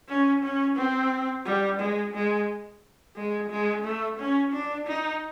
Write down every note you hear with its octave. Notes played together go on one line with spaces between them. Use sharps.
C#4
C#4
C4
G3
G#3
G#3
G#3
G#3
A3
C#4
D4
D#4